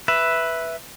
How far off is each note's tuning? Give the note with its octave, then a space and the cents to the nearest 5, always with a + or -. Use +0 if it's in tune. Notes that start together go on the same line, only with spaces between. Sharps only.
B4 +0 E5 +0